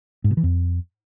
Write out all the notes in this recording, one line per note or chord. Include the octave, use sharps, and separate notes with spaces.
G#2
B2
E3
F2